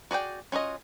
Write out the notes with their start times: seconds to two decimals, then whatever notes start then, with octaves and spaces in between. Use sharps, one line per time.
0.11 F#4 G#4 D5 G5
0.52 C#4 F4 F#4 D#5